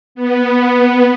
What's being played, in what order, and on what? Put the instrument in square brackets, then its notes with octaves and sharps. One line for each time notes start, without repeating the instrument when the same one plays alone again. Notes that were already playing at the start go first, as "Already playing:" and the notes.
[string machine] B3